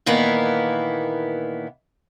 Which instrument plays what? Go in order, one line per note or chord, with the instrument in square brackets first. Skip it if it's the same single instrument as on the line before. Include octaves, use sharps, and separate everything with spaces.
[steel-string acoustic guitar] A#2 D#3 E3 A#3 B3 E4